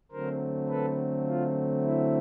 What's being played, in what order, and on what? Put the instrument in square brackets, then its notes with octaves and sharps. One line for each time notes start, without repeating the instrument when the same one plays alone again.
[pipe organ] D3 F#3 A3 C4 A#4 C5
A4 B4
F4
E4